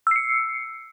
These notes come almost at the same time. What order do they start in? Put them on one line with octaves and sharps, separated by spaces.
E6 C7 C#7